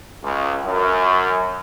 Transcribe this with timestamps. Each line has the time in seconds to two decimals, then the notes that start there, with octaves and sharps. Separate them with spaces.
0.24 C#2
0.66 F#2